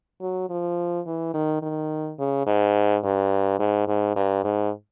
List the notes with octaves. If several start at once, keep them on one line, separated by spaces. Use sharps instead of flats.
F#3
F3
E3
D#3
D#3
C#3
G#2
G2
G#2
G#2
G2
G#2